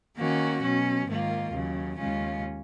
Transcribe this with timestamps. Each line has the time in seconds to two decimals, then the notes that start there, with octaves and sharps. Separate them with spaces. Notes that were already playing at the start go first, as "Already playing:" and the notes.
0.17 D#3 A#3 C#4 F#4
0.61 B2 F#3 C#4
1.07 G#2 D#3 A#3 F4
1.52 D#2 C#3 F#3
1.96 D#2 C#3 G#3 C#4 F4